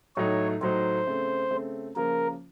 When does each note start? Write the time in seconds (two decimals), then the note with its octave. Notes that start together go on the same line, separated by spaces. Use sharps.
0.16 A2 F#3 A3 D#4 C#5
0.61 A2 F#3 A3 D#4 C5
1.07 C#3 A3 C4
1.51 C#3 A3 C4
1.96 C#3 F3 A#3 F4 A#4